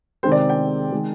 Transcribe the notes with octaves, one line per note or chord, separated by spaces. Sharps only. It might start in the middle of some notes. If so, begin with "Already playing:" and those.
C3 D#3 G#3 C4 C5
D5
G5
D#3 G#3 C4